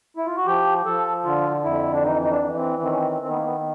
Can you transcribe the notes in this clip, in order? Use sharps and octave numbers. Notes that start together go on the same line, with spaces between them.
E4
F4
F#4
F3 G4
F3 A4
D3 F4
F2 E4
D4
E3 D#4
D#4
D4
E3
C4
D#3 C4
C#4
C4
D#3 C4
B3
A#3
B3